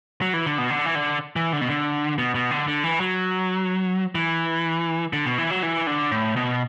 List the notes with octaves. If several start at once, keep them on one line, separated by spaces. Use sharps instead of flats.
F#3
E3
D3
B2
D3
E3
D3
E3
D3
B2
D3
B2
B2
D3
D3
E3
F#3
E3
D3
B2
E3
F#3
E3
D3
A2
B2